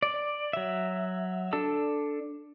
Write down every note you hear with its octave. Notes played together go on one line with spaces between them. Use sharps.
D5
F#3 E5
D4 A4 A5 E6